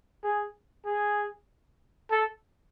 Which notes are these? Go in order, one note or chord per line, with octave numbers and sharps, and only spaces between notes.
G#4
G#4
A4